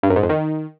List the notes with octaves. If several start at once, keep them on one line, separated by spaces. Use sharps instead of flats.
G2
F#2
G#2
F2
D#3